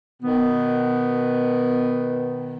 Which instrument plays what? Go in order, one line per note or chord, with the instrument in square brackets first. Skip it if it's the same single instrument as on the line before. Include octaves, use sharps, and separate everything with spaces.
[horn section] B2 D#3 B3